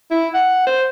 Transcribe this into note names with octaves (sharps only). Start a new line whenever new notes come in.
E4
F#5
C5